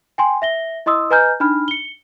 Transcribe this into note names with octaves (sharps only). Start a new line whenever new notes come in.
G5 G#5 C6
E5 A#6 G7
E4 D#5 C6 D#6 E6
B4 D#5 G#5 A#5 F6 G6
D4 D#4 B5 F6
C#7 G7